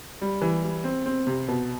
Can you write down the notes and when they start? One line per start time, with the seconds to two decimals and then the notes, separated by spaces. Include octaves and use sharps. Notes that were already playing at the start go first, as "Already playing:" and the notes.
0.21 G3
0.42 E3
0.64 G3
0.84 C4
1.06 C4
1.27 C3
1.48 B2